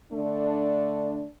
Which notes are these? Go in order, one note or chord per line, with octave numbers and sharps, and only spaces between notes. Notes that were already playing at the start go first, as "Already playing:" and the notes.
D3 A3 D4